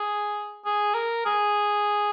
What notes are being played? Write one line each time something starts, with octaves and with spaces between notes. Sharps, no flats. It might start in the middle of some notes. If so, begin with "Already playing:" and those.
Already playing: G#4
G#4
A#4
G#4